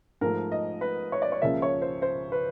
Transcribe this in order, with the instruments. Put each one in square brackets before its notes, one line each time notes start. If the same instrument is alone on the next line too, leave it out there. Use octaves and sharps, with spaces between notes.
[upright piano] G#2 F3 A3 A#4
D#5
B4
C#5
D5
C#5
C#2 C#3 F3 A#3 E5
C#5
C5
C5
B4